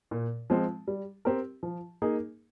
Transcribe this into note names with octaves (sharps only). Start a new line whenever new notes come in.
A#2
F3 G#3 C4
G3
C4 G4 A#4
F3
A#3 D#4 G#4